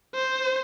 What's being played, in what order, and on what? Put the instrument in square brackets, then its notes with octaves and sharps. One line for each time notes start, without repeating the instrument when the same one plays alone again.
[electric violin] C5